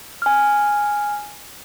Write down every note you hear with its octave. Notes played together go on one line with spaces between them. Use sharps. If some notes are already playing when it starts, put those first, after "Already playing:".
G#5 F6